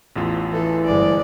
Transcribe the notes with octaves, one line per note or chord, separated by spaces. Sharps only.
A1 E2 F4
E3 A4
G1 G#3 D5